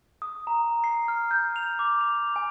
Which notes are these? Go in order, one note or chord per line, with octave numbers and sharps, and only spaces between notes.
D#6
A#5
C7
F6
G6
F7
D6
F7
G#5